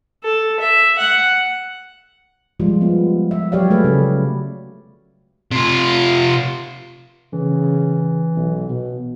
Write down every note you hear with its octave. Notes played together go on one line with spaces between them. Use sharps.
A4
E5
F#5
F3 G3 G#3 F4
B3
E5
F#3 G4 C#5 D5 F5
G#3 A3 G#4 B4
C#3
C3 F4
C#3 E3
B1
B2